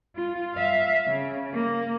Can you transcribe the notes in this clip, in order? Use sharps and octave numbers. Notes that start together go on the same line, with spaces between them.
F4
E5 F5
C#3
A#3